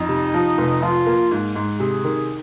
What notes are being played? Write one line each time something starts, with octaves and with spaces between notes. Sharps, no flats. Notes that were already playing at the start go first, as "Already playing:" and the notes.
Already playing: F2 D#4
C3
F3
F1
F3 F4
A#3
G#2
G#2
C3 G#4
D#3